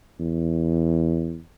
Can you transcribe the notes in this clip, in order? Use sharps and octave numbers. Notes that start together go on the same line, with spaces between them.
E2